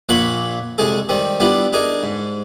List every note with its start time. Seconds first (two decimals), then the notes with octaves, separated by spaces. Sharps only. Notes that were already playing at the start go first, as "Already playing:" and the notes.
0.09 A#1 A#2 A#3 C#5 F#5 B5
0.78 C2 G#3 G#4 A4
1.09 D#3 G3 C4
1.40 G3 B3 D4 E4 F4
1.73 D4 D#4 G#4 A#4
2.03 G#2